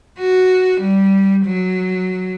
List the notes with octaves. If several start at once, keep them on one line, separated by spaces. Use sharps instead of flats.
F#4
G3
F#3